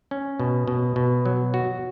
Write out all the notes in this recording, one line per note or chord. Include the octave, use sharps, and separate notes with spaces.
C#4
B2
B2
B2
F#3
F#4